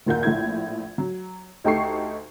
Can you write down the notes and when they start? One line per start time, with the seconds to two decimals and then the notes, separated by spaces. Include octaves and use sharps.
0.06 F#1 D#2 A#2 A#3 F#5 G6
0.23 A#1 A2 G#6
0.98 F#3
1.64 D2 D#4 G4 A4 C#6 C7